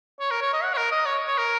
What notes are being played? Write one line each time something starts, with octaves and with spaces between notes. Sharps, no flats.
C#5
A#4
C#5
D#5
F#5
C#5
A#4
D#5
C#5
C#5
A#4